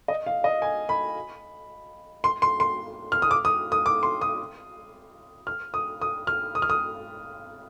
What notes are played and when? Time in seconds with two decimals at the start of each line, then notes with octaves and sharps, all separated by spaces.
0.08 D#5
0.26 F5
0.44 D#5
0.62 G#5
0.89 B5
2.24 C6
2.42 C6
2.60 C6
3.12 F6
3.22 D#6
3.31 D6
3.45 D#6
3.72 D#6
3.86 D6
4.03 C6
4.21 D#6
5.47 F6
5.74 D#6
6.01 D#6
6.27 F6
6.55 D#6
6.62 F6
6.70 D#6